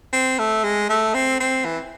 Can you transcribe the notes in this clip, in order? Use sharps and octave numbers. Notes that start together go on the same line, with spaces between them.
C4
A3
G#3
A3
C4
C4
E3